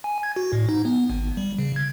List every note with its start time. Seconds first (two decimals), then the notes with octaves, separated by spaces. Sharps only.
0.04 G#5
0.23 G#6
0.36 F#4
0.53 A2
0.69 D#4
0.85 B3
1.10 G#1
1.37 G3
1.58 C#3
1.76 G#6